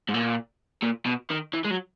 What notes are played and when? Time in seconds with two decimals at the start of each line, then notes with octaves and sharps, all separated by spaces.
0.09 G#2
0.14 A#2
0.83 A#2
1.06 B2
1.30 D#3
1.53 E3
1.64 G#3
1.70 F#3